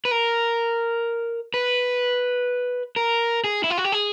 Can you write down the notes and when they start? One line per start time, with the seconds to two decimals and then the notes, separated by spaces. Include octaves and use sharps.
0.05 B4
0.11 A#4
1.54 B4
2.96 A#4
3.44 G#4
3.64 E4
3.70 F4
3.78 F#4
3.84 G4
3.92 G#4